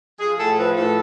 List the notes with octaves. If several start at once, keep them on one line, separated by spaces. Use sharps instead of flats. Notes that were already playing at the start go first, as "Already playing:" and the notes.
F3 G#4
A2 A4
F3 B4
A2 A4